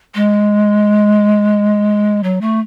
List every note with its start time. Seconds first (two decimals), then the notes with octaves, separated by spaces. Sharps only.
0.15 G#3
2.23 F#3
2.41 A3